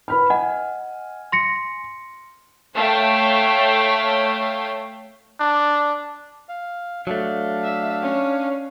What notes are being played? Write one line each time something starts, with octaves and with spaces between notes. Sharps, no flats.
B4 B5 F6
D#5 F#5 G#5
C6 A#6 C#7
A3 C#5 F5 G5
D4
F5
F#3 A3 D4 F5
E5
C#4